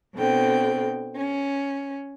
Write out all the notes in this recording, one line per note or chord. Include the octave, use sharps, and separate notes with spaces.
B2 D3 C4 G5
C#4